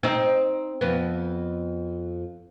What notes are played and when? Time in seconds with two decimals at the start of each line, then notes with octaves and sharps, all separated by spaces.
0.03 C4 D#4
0.81 F2 B3